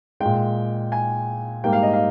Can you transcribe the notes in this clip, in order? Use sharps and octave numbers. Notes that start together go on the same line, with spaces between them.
A#2 G#3 G5
G#5
G#2 G3 A#3 G5
F5
D#5
F5